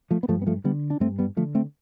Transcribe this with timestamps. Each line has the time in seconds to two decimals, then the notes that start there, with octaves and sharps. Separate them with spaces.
0.11 F3 A3
0.23 B3
0.28 G2 F3 A3
0.42 B3
0.47 F3 A3
0.64 D3 G3 B3
0.90 D4
1.00 G2 A3 C4
1.19 G3 B3
1.37 D3 F3 A3
1.55 A3 C4